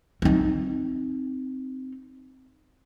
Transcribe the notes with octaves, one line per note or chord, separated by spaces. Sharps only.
C4 D#4